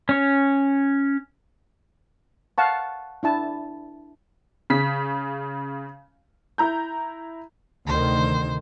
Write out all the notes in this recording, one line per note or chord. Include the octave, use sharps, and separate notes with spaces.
C#4 C#5
F5 F#5 A5 C#6
D4 E4 A5
C#3 B6
E4 A#5 G6
D2 C3 D#3 C5